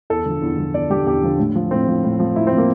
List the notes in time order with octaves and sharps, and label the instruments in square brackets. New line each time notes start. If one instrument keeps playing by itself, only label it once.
[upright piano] E2 A4
D3 F3
E2
D3 F3
E2 D5
D3 F3 G4
E2 G4
D3 F3
A2
F3
A2 C4
F3
A2
F3
A2 E4
C4
F3
A#3